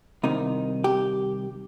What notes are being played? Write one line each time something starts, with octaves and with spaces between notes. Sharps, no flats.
C2 C3 D#3 D#4
G4